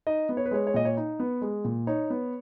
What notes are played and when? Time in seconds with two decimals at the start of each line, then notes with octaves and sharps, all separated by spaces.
0.07 D#4 D#5
0.29 B3
0.37 C#5
0.46 B4
0.51 G#3 C#5
0.67 C#5
0.74 A#2 D#5
0.85 C#5
0.97 D#4
1.19 B3
1.42 G#3
1.65 A#2
1.87 D#4 C#5
2.10 B3